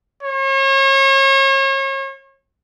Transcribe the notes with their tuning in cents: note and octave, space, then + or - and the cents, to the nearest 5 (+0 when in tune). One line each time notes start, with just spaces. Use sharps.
C#5 -40